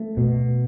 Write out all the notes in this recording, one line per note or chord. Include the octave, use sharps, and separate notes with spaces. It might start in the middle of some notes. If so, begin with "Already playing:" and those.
Already playing: A3
B2